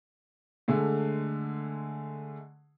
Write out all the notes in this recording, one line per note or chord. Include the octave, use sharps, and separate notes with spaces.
D3 G#3 A3